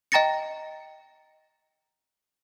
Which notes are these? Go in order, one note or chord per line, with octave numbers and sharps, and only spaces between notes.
D#5 G5 A#5 A6 A#6 C#7